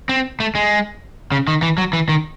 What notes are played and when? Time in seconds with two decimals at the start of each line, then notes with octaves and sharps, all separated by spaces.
0.09 C4
0.40 A3
0.55 G#3
1.32 C#3
1.48 D#3
1.62 E3
1.78 F#3
1.93 E3
2.09 D#3